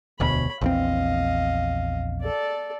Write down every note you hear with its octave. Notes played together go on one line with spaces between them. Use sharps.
E1 D2 B2 C#5 B5
A#1 E2 C4 D#5 F5
A4 D5